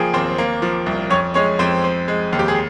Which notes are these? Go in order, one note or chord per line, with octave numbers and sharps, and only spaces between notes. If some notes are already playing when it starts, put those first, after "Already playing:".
Already playing: F3 A#3 G#4 G5 G#5
D#2 C4 C5
A#3
F3
C2
F2 C#4 C#5
G#3 C#4 C#5
F2 C4 C5
C4
G#3
D#2
G4
G#4